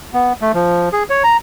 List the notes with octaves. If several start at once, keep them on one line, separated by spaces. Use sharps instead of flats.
B3
A3
F3
G#4
C#5
A#5